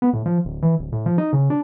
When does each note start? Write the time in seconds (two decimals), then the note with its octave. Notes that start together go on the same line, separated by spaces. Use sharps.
0.02 B3
0.13 A2
0.26 F3
0.45 D1
0.62 E3
0.79 D1
0.92 A2
1.06 F3
1.18 D#4
1.33 C#3
1.50 D4